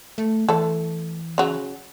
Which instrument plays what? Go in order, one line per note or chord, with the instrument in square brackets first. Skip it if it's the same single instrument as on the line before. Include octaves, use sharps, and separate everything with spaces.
[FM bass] A3
[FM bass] E3 [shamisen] A3 A4
[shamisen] C#3 F#3